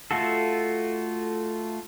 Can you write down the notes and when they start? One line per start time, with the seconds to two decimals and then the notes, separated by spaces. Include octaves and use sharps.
0.11 A3 F4 F#4 A4